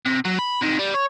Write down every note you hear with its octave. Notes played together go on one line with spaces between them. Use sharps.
C3
F#3
B5
C3 D#3
G3
C#5